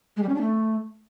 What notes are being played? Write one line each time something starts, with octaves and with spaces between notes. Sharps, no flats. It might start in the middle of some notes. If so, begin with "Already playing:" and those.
G#3
G3
C#4
D4
A3